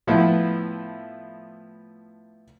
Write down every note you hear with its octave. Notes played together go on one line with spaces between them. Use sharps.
A2 F3 B3 E4